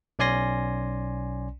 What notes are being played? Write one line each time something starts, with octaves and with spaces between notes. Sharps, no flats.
B1 C#4 D5 G#5 C6 A#6